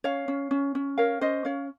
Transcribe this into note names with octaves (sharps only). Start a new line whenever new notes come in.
C#4 C#5 F5
C#4
C#4
C#4
A#4 C#5 F5
C#4 C5 D#5
C#4 C#5 F5